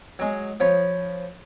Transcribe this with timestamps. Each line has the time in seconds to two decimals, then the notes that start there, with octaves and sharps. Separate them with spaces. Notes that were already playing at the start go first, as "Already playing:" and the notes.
0.19 F#3 G#3
0.60 F3 C#5 B5